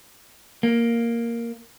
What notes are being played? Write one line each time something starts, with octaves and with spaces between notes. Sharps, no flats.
A#3